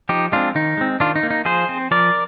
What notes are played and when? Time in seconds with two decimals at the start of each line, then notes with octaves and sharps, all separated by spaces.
0.09 F3 D#4 G4
0.32 G#3 C4 D4 F4
0.55 D#3 D#4
0.77 G#3 C4
1.00 D#3 D4 F4
1.16 D#4
1.23 A#3
1.30 D#4
1.45 F3 G#4 C5
1.69 C4
1.91 F3 A#4 D5